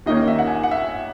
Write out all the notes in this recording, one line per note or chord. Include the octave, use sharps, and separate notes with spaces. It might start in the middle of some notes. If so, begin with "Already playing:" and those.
D#2 D#3 A#3 C#4 D#5
E5
F#5
G#5
F#5
E5